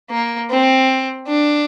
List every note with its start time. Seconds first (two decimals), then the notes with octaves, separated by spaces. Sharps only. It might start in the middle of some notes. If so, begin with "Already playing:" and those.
0.11 A#3
0.50 C4
1.27 D4